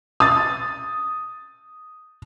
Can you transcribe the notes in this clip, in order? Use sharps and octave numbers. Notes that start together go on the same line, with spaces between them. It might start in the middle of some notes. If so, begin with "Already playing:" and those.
D#6 A6